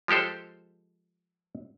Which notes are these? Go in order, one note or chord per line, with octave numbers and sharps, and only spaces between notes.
F3 G#3 G4 A4 C5